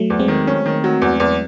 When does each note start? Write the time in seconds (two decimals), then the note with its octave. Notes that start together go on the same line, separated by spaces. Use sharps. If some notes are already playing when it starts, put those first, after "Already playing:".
Already playing: F#3 A3
0.10 E2
0.19 G#3 C4
0.28 D#3
0.47 C#4
0.66 D#3
0.84 F#3
1.02 E2
1.20 E2